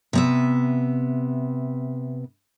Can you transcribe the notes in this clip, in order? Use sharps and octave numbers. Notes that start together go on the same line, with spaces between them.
C3 B3 E5